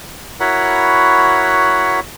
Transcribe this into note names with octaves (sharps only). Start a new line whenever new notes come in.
E4 F#4 A#4 C#5 F#5 B5